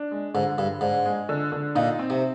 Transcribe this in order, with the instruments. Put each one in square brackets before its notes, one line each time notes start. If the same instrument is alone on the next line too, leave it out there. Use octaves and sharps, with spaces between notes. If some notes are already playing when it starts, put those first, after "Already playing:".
Already playing: [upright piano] D4
G#3
[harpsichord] G#2 [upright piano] D3
[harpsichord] G2 [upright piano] D3
[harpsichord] G#2 [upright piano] D4
[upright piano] G#3
D3
D3
[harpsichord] A#2 [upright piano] D#4
[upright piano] C4
[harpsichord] C3